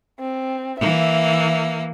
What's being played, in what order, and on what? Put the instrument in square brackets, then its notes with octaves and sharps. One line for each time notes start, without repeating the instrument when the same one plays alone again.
[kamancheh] C4
[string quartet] E3 A#3 [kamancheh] E5